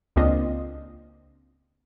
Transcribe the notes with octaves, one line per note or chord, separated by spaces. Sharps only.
C#2 A#3 C4 D4 F4 D#5